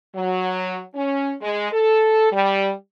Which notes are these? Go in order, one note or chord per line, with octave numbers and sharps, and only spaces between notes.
F#3
C#4
G#3
A4
G3